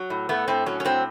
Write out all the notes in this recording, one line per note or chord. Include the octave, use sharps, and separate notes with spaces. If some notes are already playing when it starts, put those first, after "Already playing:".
Already playing: F#3
A2
A3 B3
A2 C4
F#3 C#4
C#4
A2 C4